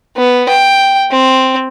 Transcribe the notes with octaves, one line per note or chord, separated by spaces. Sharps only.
B3
G5
C4